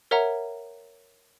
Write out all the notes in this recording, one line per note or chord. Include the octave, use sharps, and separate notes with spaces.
A#4 C#5 E5 F#5 A#5